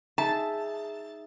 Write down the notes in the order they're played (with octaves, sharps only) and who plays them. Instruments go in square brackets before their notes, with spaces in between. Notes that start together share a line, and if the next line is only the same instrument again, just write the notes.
[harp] D#4 G#4 E5 [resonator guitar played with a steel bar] A5